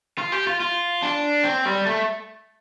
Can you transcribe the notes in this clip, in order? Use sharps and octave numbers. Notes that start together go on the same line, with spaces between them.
F4
G4
F4
F4
D4
C4
G3
A3